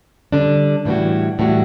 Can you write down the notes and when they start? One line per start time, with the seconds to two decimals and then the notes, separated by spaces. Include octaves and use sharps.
0.32 D3 G3 D4
0.85 A2 E3 G3 D4 F#4
1.39 A2 E3 G3 D4 F#4